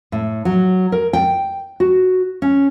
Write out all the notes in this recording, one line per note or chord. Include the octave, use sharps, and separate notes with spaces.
A2
F#3
A#4
G5
F#4
C#4